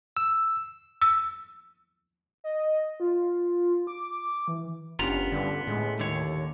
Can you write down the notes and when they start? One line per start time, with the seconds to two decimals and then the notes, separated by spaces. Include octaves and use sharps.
0.17 E6
1.02 E6
2.44 D#5
3.00 F4
3.87 D6
4.48 E3
4.99 F#1 B3 C#4 D4 F4 G4 A#5
5.32 G2 D3
5.67 A2 G#3
6.00 D#2 D3 D#3 C#5